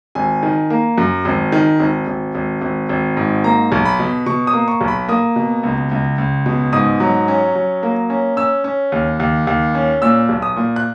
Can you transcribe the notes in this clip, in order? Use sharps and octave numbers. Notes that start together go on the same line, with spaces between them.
G#1 G#5
D#3
A#3
F#2
G#1
D#3
G#1
G#1
G#1
G#1
G#1
G#2
A#3 A#5
B1
B5
B2
B2 C#6
D#6
A#3
C#6
B1
B5
A#3 D#6
B2
C#2
C#2
C#2
B2
G#2 D#6
F#3
C#4
F#3
A#3
C#4
C#4 E6
C#4
D#2
D#2
D#2
C#4
A#2 E6
B1
D#6
A#2
F#6